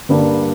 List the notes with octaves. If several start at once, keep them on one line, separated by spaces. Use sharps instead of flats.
G2 D3 G3 A#3 D4